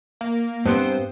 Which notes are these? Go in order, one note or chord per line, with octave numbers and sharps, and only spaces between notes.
A#3
G2 B3 C4 C5